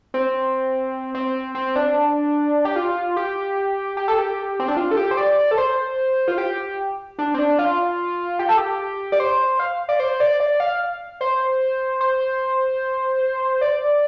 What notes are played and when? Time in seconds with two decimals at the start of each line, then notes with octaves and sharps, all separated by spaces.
0.14 C4
1.15 C4
1.55 C4
1.76 D4
2.65 G4
2.76 F4
3.17 G4
3.97 G4
4.08 A4
4.18 G4
4.60 C4
4.68 D4
4.77 F4
4.91 A4
4.97 G4
5.11 C5
5.17 D5
5.51 A4
5.58 C5
6.28 F4
6.38 G4
7.19 D4
7.34 C4
7.38 D4
7.59 F4
8.39 G4
8.49 A4
8.58 G4
9.12 D5
9.20 C5
9.59 F5
9.89 D5
10.00 C5
10.20 D5
10.40 D5
10.60 F5
11.21 C5
12.01 C5
13.61 D5